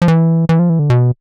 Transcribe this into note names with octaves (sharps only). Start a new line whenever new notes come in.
F3
E3
E3
F3
E3
D3
B2